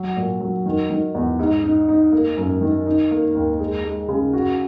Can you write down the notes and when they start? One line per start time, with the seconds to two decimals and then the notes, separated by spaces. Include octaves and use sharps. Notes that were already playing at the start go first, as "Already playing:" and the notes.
Already playing: F#3
0.16 A#2
0.40 F#3
0.66 D#3
0.90 D#3
1.15 E2
1.39 G#2
1.64 D#4
1.88 D#4
2.12 A#3
2.37 F#2
2.61 D#3
2.86 D#4
3.11 A#3
3.35 D#2
3.59 G#3
3.84 G#3
4.09 C#3
4.33 F#4